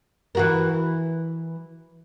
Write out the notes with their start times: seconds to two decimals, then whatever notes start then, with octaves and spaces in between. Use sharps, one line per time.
0.35 E3 F#4 A#4